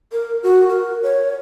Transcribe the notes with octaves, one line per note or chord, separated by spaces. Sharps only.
A#4
F#4
A#4
C#5